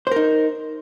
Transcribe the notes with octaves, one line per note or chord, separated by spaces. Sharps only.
D#4 A#4 C5